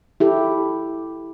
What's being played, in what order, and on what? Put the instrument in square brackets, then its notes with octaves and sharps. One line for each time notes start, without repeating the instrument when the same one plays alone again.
[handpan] E4 G4 A4